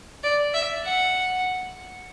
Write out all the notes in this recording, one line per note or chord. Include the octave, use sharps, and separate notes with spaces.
D5
E5
F#5